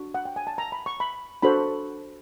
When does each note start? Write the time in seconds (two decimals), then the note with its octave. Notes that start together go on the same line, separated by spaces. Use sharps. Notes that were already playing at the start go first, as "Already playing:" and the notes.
Already playing: D4 F#4
0.14 F#5
0.25 G5
0.36 G#5
0.47 A5
0.58 A#5
0.72 B5
0.86 C#6
1.00 B5
1.42 D4 F#4 A4 C5 B5